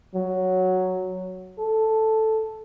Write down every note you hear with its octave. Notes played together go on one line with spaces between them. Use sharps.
F#3
A4